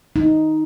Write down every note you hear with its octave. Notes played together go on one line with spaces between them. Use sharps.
D#4